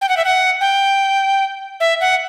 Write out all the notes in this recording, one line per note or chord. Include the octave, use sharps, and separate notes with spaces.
G5
F#5
E5
F#5
G5
E5
F#5